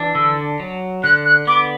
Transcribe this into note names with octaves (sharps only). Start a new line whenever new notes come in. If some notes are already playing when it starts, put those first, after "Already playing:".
Already playing: E3 D4
D3 E6
F#3
D3 F#6
F#6
B3 D6